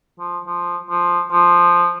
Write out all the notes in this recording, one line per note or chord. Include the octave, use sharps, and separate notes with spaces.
F3
F3
F3
F3